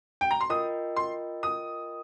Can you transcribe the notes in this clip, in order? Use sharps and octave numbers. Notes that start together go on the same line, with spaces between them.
G5
A#5
C6
F4 A#4 D#5 G5 D#6
C6
D#6